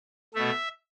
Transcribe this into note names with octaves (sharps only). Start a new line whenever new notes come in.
B2 A3 E5